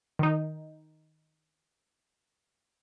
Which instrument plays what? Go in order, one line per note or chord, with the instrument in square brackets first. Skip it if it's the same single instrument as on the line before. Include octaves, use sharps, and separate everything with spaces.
[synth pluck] D#3 D#4